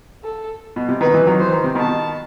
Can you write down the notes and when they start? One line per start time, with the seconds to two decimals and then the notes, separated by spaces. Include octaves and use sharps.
0.24 A4
0.76 B2
0.89 C3
1.01 B2 D#3 B4
1.14 C3 E3
1.27 D#3 F#3
1.40 E3 C5
1.52 D#3
1.64 C3
1.75 B2 D#3 A5